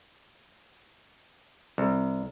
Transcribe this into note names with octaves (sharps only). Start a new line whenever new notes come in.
C2